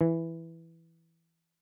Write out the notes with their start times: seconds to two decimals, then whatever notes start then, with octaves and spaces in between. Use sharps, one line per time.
0.01 E3